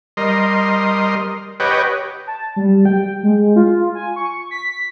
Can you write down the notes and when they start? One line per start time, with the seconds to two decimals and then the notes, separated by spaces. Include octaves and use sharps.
0.17 G3 A#4 D#5 C6
1.60 G4 B4 C#5 D#5 F#5 G5
2.27 A5
2.56 G3
2.85 G5
3.23 G#3
3.56 F4
3.95 G#5
4.16 C#6
4.51 B6